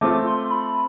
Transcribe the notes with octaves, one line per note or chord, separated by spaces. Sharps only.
A3 C4 F4 D6
C6
B5